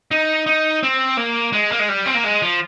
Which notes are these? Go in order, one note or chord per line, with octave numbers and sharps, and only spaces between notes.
D#4
D#4
C4
A#3
G#3
A#3
G#3
G3
C4
A#3
G#3
F3